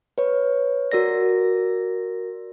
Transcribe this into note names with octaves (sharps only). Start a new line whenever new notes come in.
B4 C#5
F#4 A#4 D5 A#6